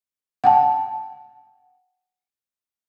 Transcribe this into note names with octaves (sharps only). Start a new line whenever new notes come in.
F#5 G5 A5